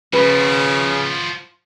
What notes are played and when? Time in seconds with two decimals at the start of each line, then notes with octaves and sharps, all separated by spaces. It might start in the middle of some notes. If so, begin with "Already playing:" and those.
0.13 C#3 F3 F#4 B4